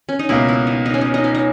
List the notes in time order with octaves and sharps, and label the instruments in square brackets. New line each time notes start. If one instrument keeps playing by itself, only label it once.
[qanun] C#4
D#4
[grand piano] C#2 B2 A#3 [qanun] E4
[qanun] E4
D#4
D#4
C#4
D#4
D#4
C#4
D#4